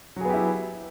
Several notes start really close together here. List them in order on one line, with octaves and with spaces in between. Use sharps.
F#3 G#4 B3 G4 E4